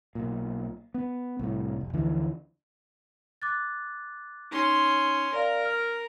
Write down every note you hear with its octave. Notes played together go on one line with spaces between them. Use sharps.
B1 A#2
B3
C2 A2
F1
D2 D3 E3 F3
D6 F#6 A6
C#4 D#4 C6
A#4 D5 F5
F6